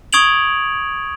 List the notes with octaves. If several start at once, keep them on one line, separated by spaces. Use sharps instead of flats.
C#6 D#6 G#6 D7 F7 F#7